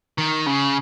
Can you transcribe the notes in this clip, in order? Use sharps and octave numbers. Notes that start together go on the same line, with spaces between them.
D#3
C#3